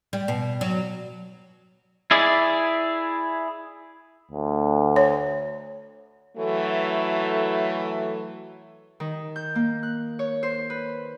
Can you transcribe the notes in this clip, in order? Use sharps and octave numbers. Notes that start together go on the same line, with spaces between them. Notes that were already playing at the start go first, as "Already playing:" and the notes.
G3
B2
F#3
E4 G#4 D5
D2
C#5
E3 F#3 A3 A4
D#3
G6
A#3
F#6
C#5
C5
B4